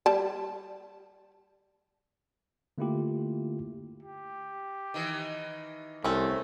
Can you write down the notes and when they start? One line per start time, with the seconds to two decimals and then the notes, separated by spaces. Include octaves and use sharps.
0.06 G3 A5
2.78 D3 A3 A#3 E4 F4 G4
4.03 G4
4.94 D#3 E3
6.04 C2 A3 C4 C#4